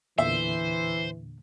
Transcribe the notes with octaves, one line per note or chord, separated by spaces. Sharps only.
E2 A#2 D3 E3 C5 E5